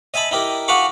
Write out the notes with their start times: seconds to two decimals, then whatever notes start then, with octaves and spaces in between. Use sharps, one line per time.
0.14 D#5 E5 G#5 A5 B5
0.31 D#4 E4 G4 A#4
0.68 F#4 G#4 F5 B5 C#6 D6